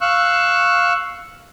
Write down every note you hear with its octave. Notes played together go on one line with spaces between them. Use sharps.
F5 C#6 E6 F#6